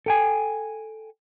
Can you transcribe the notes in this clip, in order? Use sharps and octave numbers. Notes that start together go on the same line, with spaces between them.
A4 G5 G#5